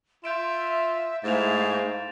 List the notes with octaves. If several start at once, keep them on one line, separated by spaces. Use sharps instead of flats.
F4 E5 G6 D7 E7
G#2 A3 E4 F5 G#5 A6 E7 F7